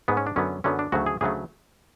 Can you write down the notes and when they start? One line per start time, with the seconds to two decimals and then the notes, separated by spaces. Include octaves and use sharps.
0.08 G#2 G#3 B3
0.17 C#4
0.26 D4
0.36 F#2 D3 F#3 B3 C#4
0.64 F#2 D3 F#3 B3 C#4
0.79 D4
0.92 D2 C#3 F#3 A3 F#4
1.06 G#4
1.21 D2 C#3 F#3 A3 G#4